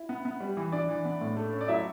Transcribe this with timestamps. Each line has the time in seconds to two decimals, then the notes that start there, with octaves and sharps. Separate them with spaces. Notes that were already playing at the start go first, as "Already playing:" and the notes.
Already playing: E4
0.09 B3
0.25 B3
0.40 G3
0.57 E3
0.72 E3 D4 D5
0.89 E3
1.05 B3
1.21 A2
1.37 A3
1.53 C#4
1.61 D5
1.68 F#3 E4 E5